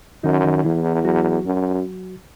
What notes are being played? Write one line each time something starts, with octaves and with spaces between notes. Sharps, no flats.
F#2 D#3 D#4
D#3 D#4
E2 E3 E4
F#3 F#4
F#2